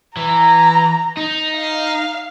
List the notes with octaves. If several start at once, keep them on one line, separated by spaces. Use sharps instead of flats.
E3 A#5
D#4
F5